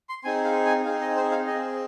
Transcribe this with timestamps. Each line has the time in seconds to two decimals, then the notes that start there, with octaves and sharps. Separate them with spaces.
0.09 C6
0.24 C4 D#4 G#4 G#5
0.45 F5
0.66 G#5
0.85 C4 D#4 G#4 F5
1.01 D#5
1.16 C5
1.31 F5
1.46 C4 G#4 D#5